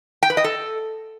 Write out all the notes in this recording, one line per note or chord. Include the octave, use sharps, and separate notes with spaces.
G5
B4
D#5
A4